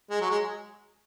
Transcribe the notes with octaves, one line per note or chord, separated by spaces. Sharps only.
G#3
F#3
G#3